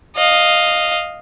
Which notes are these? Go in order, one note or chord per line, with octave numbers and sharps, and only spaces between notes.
D#5 F5